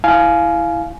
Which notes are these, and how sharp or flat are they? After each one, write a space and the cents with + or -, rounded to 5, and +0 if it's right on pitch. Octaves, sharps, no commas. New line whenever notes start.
E4 +0 F5 -10 G#5 +25